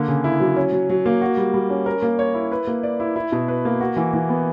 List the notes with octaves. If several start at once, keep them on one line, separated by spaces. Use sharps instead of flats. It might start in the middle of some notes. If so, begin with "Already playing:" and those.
Already playing: D3 A#3
C#3
E4
F#3
C#4
F#3
F#3
A#3
F#4
G3
G3
C#4
A#4
A#3
C#5
E4
B4
A#3
D5
E4
E4
B2
B4
A#3
F#4
E3
E3
B3